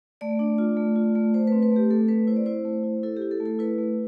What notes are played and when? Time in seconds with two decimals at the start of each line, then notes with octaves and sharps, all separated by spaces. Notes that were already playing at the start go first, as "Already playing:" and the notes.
0.21 A3 D5
0.39 D4
0.58 F4
0.77 A3
0.96 F4
1.15 A3
1.34 A3 C5
1.47 C4 B4
1.63 B4
1.72 A3 G4
1.90 A3 A4
2.08 C4 B4
2.27 E4 C5
2.37 D5
2.46 E4 C5
2.65 A3
2.84 E4
3.03 E4 A4
3.17 E4 G4
3.31 A4
3.40 A3
3.45 A4
3.59 E4 B4
3.78 A3